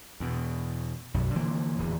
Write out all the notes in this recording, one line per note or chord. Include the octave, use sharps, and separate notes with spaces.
E2 B2
B1 F#2
D3 E3 F3 A#3
D1 E2